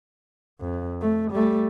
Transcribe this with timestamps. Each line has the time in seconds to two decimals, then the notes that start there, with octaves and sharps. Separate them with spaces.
0.61 F2
1.02 A3
1.31 G3 A3